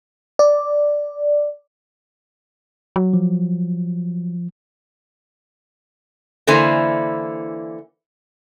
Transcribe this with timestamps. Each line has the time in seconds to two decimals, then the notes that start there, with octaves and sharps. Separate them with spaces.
0.39 D5
2.96 F#3
3.13 F3
6.47 D3 E3 A#3 E4 C5 G#5